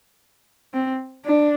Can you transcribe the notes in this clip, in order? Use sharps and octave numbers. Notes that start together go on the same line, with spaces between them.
C4
D4